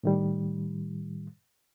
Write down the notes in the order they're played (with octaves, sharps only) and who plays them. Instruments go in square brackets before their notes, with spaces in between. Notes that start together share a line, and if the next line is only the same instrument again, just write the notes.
[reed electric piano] A2 D#3 G3